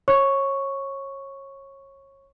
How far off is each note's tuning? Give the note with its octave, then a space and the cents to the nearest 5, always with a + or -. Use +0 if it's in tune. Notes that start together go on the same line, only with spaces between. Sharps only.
C#5 -25 C#6 +0